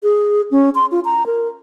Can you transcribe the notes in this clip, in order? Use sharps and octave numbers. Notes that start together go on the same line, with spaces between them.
G#4
C#4
C6
F4
A#5
A#4